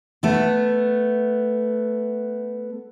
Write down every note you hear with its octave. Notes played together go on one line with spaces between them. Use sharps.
A3 B3